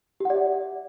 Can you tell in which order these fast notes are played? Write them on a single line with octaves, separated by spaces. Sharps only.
G4 F#5 D5 E5